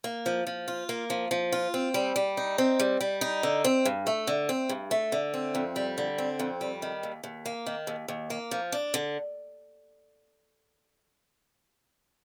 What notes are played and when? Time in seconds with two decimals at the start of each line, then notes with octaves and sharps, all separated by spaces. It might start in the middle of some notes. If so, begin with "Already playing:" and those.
0.04 A#3
0.26 F3
0.47 F3
0.68 F4
0.89 A#3
1.10 F3
1.31 F3
1.52 F4
1.74 C4
1.94 G3
2.16 G3
2.37 D#4
2.58 C4
2.80 G3
3.01 G3
3.21 D#4
3.43 D3
3.64 C4
3.85 G2
4.07 A3
4.27 D3
4.49 C4
4.69 G2
4.91 A3
5.12 D3
5.34 C4
5.55 F2
5.76 G3
5.98 D3
6.18 C4
6.39 F2
6.61 G3
6.82 D#3
7.03 D#2
7.24 D#2
7.46 A#3
7.66 D#3
7.87 D#2
8.08 D#2
8.30 A#3
8.51 F3
8.72 D4
8.94 D3